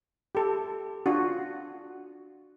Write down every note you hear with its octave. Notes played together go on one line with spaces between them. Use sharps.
G4 A4
D4 F4 F#4